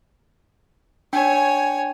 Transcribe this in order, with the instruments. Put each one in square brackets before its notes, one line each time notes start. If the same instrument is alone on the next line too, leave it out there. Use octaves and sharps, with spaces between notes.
[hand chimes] D4 G5 [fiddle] C#5 G#5